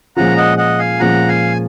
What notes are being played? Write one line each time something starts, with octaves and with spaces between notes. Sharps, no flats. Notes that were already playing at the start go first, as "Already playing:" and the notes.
A#2 F3 G#3 C#4 F4 F#5 A#5
D#5 F#5
D#5 F#5
F5 G#5
A#2 F3 G#3 C#4 F4 F#5 A#5
F5 G#5